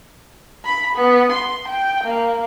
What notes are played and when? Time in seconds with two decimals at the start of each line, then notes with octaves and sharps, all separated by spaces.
0.65 B5
0.96 B3
1.32 C6
1.69 G5
2.04 A#3